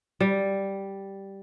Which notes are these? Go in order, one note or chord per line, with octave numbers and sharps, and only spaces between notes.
G3